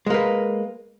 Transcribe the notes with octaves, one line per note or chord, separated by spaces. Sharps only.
G#3 A#3 B4